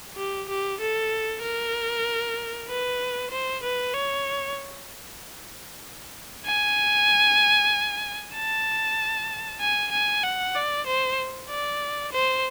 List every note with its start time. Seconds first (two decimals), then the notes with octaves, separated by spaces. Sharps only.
0.17 G4
0.49 G4
0.80 A4
1.43 A#4
2.68 B4
3.31 C5
3.63 B4
3.94 C#5
6.46 G#5
8.35 A5
9.61 G#5
9.92 G#5
10.24 F#5
10.55 D5
10.87 C5
11.49 D5
12.12 C5